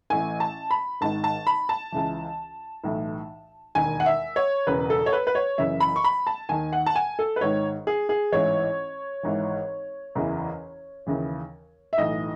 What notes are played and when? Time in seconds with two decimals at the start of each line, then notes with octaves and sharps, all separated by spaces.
0.10 A1 A2 E3 G#5
0.40 A5
0.71 B5
1.01 G#1 G#2 D#3 A5
1.24 A5
1.47 B5
1.69 A5
1.92 C#2 C#3 E3
2.84 B1 A2 E3
3.75 E1 D#2 D#3 G#5
4.00 F#5
4.06 E5
4.36 C#5
4.67 E1 E2 C#3 B4
4.90 A4
5.06 C#5
5.13 B4
5.27 B4
5.35 C#5
5.58 F#1 F#2 C#3 E3 E5
5.80 B5
5.96 C#6
6.04 B5
6.27 A5
6.49 D#2 D#3 G#5
6.73 F#5
6.86 A5
6.95 G#5
7.19 A4
7.36 B4
7.41 G#1 G#2 D#3 C#5
7.87 G#4
8.09 G#4
8.32 A1 G#2 E3 C#5
9.23 G#1 G#2 E3
10.15 F#1 E2 C#3 E3
11.07 D#2 C#3 E3
11.93 E5
11.98 B1 A2 E3 D#5